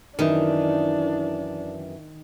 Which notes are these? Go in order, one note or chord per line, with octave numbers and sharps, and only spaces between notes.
F#2 D#3 E3 D4